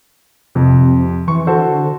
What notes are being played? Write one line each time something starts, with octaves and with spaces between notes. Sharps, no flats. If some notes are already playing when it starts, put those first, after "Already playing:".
F2 C3
E3 C#6
D3 F#4 A4 C5